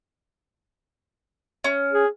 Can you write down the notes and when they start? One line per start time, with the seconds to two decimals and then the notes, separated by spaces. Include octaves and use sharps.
1.64 C#4
1.93 G#4